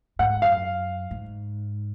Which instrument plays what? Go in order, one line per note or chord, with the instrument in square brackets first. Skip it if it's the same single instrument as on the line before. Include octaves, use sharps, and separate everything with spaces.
[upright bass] G#2 [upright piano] F#5
[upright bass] F#2 [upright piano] F5
[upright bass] G#2